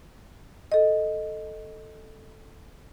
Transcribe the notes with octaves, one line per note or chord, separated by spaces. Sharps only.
A4 D#5